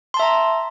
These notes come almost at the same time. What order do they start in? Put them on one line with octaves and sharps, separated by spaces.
C6 A5 E5 A#5